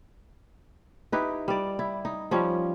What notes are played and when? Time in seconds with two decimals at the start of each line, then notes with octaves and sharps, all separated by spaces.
1.12 D#4 E4 G4 B4
1.48 G3 D5
1.79 E4
2.05 D#4
2.31 F3 G3 C#4